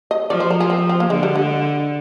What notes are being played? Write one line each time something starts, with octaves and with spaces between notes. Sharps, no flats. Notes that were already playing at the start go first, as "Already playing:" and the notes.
D#5
F3 D5
C5
A#4
G#4
C4
C4
A#3
D3 G#3
G3
G#3